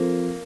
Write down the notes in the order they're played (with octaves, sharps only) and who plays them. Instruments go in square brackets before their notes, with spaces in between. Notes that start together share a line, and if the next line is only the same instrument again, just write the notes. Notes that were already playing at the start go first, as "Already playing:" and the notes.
Already playing: [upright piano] F3 C4 F4 A4 C5 [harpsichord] A#3